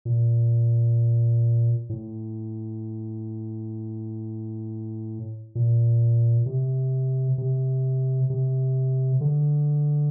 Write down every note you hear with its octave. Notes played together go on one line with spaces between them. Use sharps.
A#2
A2
A#2
C3
C3
C3
D3